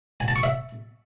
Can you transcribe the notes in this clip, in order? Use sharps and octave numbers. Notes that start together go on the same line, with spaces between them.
G#5
A5
C#6
E5